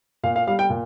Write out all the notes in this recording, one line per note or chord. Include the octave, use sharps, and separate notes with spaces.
A#2 F5
F5
G3 F5
G5
A#2